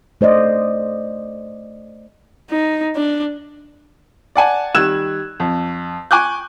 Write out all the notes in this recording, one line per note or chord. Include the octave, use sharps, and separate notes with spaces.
A3 C5 D5 D#5
D#4
D4
D5 F#5 G#5 A5
D#3 G3 E6 F#6 G#6 E7
F2
G#5 C#6 D6 F#6 G6